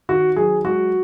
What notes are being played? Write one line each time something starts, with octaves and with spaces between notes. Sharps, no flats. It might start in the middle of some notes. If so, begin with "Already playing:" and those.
D#3 F#4
F#3 G#4
G#3 F#4